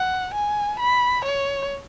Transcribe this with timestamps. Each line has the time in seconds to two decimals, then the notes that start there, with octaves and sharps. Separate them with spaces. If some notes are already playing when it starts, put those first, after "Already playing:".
Already playing: F#5
0.34 G#5
0.80 B5
1.25 C#5